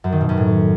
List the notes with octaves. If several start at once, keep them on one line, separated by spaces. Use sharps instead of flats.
F#2
D#3
B2
F#2
A2